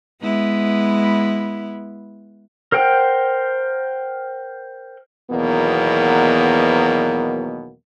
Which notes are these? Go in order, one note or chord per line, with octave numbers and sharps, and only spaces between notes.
G#3 B3 E4
A#4 C5 F#5 G5
E2 B2 D#3 F#3 A#3 B3